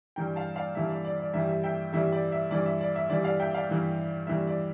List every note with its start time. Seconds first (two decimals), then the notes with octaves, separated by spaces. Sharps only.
0.16 G2 E3 G3 G5 A#5
0.36 F5 A5
0.56 D5 F5
0.75 G2 E3 G3 E5
0.90 D5
1.05 D5
1.20 D5
1.33 G2 E3 G3 E5
1.49 E5
1.64 E5 G5
1.93 G2 E3 G3 E5
2.12 D5
2.32 E5
2.51 G2 E3 G3 D5
2.66 E5
2.81 D5
2.96 E5
3.10 G2 E3 G3 D5
3.24 D5 F5
3.40 E5 G5
3.53 D5 F5
3.69 G2 E3 G3
4.27 G2 E3 G3 E5
4.47 D5